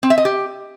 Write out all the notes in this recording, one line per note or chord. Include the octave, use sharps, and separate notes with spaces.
C4
E5
D#5
G4